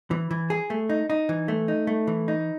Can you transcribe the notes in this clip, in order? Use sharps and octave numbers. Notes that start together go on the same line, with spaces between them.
E3
E3
G#4
A3
D#4
D#4
E3
A3
D#4
A3
E3
D#4